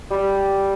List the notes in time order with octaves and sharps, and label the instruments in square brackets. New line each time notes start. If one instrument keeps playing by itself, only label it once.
[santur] G3